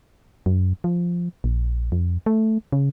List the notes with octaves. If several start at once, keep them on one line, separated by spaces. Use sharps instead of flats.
F#2
F3
A#1
F2
A3
C#3